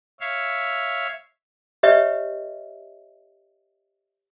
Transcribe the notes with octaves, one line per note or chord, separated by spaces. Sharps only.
C#5 E5 F5
G4 B4 C#5 D#5 E5